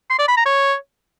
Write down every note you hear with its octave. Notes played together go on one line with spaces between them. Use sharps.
C6
D5
B5
A#5
C#5